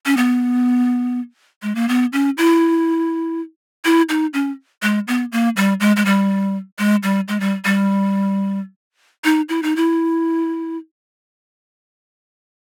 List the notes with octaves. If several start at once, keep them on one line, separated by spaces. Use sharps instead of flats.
C#4
B3
G#3
A#3
B3
C#4
E4
E4
D#4
C#4
G#3
B3
A#3
G3
G#3
G#3
G3
G#3
G3
G#3
G3
G3
D#4
E4
D#4
E4